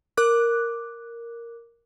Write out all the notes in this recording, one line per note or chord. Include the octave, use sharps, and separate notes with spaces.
A#4 D6 F#6